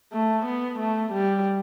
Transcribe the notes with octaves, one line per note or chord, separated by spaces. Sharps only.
A3
B3
A3
G3